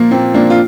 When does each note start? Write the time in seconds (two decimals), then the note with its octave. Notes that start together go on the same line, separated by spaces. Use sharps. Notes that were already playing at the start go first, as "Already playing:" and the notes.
Already playing: A#2 F3 A#3
0.11 A#2 C4
0.34 F3 A#3 D4
0.50 F4